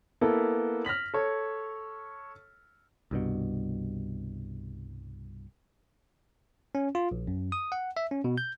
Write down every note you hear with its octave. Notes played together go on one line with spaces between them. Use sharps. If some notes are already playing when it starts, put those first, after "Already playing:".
A#3 B3 E4 A4
F6 A#6 B6 F#7
A4 C#5
C2 G2 B2
C#4
F4
A#1
F#2
D#6
F#5
E5
C#4
B2
G6